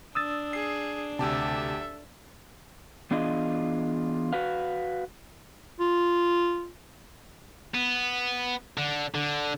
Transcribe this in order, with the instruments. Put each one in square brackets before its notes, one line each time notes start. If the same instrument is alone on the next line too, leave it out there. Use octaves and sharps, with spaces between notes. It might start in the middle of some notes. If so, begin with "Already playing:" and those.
[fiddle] D4 [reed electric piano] D#6 E6 A6
[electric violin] G#4 [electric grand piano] C7
[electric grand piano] D2 G4 A5 [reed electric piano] C3 [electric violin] A4 E5
[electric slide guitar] E3 B3 D4 F4 G#4 D#5
F#4 B4 F5
[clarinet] F4
[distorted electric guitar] B3
D3
D3